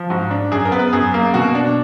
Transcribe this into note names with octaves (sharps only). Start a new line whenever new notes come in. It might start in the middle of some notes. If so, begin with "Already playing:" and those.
Already playing: F3
G#2 F#4
D4
F#2 G#4
A#4
B3
B4
F#2 G#4
A#3
B2 F#4
D4